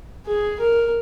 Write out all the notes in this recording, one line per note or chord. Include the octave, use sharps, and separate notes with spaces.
G#4
A#4